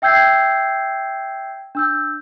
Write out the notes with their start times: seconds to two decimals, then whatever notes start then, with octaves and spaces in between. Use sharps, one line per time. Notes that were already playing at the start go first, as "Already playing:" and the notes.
0.02 E5 G5 E6 G6 G#6 C7
1.75 D4 E6 G6